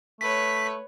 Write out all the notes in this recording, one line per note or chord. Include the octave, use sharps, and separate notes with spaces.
A3 B4 C#5 B6